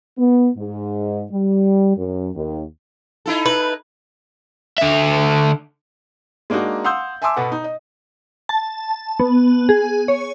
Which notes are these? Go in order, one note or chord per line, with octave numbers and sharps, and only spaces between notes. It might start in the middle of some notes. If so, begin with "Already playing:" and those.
B3
G#2
G3
F#2
D#2
D#4 E4 A4
B4
D3 E5
G#3 A#3 D4 D#4 F#4
F5 F#5 C6 D#6 E6 G6
E5 G#5 A5 C6 D6 E6
B2 B3 A4 F#5
D#4
D#5
A5
B3
G#4
C#5